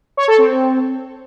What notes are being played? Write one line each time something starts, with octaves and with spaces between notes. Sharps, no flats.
C#5
A4
C4